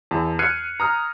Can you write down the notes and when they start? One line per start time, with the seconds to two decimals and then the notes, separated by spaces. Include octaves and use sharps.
0.11 E2 A5
0.39 F6 F#6 G#6 C7 C#7 D#7
0.80 A#5 D#6 F6